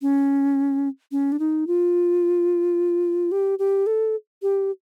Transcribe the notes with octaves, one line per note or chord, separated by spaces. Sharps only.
C#4
C#4
D4
D#4
F4
G4
G4
A4
G4